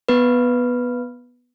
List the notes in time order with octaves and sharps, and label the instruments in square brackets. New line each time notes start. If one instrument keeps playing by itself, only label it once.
[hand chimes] B3 B4